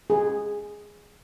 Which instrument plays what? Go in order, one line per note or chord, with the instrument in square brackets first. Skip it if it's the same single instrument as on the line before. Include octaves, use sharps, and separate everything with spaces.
[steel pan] G#4